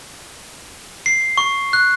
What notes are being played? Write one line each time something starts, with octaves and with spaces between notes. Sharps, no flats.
C7
C#6
F#6